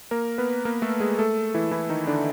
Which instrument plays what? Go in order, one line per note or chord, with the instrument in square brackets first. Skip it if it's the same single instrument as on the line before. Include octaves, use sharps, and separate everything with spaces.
[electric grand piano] A#3 A#4
B3 B4
A#3 A#4
A3 A4
G#3 G#4
A3 A4
E3 E4
E3 E4
D#3 D#4
D3 D4